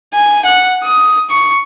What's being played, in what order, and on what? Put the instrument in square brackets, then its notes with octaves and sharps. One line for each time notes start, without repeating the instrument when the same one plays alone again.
[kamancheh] G#5
F#5
D#6
C#6